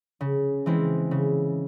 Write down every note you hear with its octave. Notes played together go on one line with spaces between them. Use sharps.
C#3
E3 G#3 C4 E4
C#3